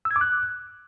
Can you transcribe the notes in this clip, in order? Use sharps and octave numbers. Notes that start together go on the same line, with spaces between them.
E6
G#6
D6
F#6